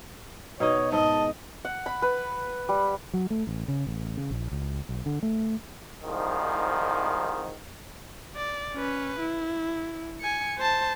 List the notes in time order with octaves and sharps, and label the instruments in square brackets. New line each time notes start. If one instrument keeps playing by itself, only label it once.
[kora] B2 D#4 D#5 [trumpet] C#5
[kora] G#2 [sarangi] D#5 [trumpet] A5
[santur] F#5
B5
B4
G3
[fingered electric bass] F#3
A3
A1
C#3
A1
C#3
A#1
C#2
B1
D3
A3
[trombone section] C2 G#2 D#3 F3
[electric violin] D5
C#4 B4
E4
G#5 C#7
C5 A5